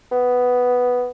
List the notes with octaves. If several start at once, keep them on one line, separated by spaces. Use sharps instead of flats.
B3